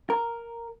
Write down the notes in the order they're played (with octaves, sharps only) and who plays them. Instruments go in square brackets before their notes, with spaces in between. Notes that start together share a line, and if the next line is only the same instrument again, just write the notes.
[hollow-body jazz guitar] A#4